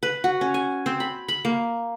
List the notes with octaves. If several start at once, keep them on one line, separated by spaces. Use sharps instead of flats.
B4
F#4
C#4
G#5
C4
B5
B5
A#3